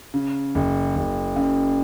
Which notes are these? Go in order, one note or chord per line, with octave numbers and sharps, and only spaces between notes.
C#3
F#1
F#1
F#2